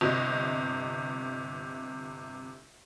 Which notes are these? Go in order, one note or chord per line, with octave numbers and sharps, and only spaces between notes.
G1 C3 D#5